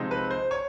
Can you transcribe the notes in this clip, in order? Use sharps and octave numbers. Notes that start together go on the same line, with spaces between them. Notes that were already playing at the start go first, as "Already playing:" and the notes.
Already playing: C3 F3 G#3 C4 D#4
B4
C5
C#5